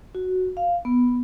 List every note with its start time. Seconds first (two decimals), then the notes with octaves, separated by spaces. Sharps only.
0.15 F#4
0.57 F5
0.85 B3